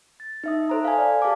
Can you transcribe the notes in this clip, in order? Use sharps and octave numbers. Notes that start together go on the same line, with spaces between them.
A6
D#4 E5 D#6
A4 C5 A#5
F5 G#5
D5 F5
G4 G#4 F5 A5 D6